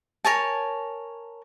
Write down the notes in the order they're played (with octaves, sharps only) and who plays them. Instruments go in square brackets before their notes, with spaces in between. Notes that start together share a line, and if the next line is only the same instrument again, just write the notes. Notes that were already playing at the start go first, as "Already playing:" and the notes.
[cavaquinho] A#4 C#5 G#5 A5